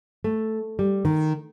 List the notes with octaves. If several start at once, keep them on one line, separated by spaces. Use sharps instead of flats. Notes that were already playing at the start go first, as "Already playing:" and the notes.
A3
G3
D#3